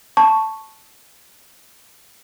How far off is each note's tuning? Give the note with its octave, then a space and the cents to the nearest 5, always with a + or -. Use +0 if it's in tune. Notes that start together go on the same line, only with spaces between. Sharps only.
A5 +0 C#6 +0